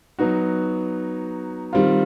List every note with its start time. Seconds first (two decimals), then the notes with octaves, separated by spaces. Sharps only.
0.19 F#3 B3 D#4 F#4
1.73 D#3 G3 C4 F4